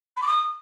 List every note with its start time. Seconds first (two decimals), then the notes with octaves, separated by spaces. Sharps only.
0.16 B5
0.21 D6
0.26 D#6